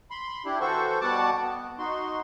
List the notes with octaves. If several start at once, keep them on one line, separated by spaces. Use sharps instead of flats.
B5 C6
D4 E4 G4
E3 F#4 A4 C5 C#6
B2 G3 F#4 F#5 A5 D6
B3
D#4 F#4 C6